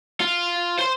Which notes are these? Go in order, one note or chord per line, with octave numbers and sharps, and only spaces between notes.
F4
C5 C6